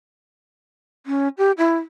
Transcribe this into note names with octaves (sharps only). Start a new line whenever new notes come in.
C#4
G4
E4